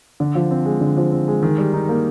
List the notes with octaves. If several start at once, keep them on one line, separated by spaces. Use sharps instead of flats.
D3
F3
C4
G#3
D3
F3
C4
G#3
D#3
G3
D#4
A#3